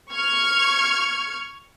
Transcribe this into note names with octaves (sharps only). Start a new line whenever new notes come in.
C#6 F6 G#6